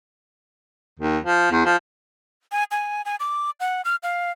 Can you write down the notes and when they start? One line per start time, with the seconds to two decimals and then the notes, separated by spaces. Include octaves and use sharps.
0.99 D#2
1.25 F3
1.51 E2
1.65 F3
2.52 G#5
2.71 G#5
3.05 G#5
3.20 D6
3.60 F#5
3.85 F6
4.03 F5